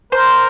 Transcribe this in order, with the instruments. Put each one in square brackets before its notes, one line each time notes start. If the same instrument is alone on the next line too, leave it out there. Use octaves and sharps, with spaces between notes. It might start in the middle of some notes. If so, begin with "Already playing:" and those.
[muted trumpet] A#4 [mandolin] C5